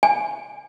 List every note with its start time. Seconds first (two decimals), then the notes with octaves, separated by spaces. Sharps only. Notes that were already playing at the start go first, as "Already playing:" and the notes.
0.03 G#5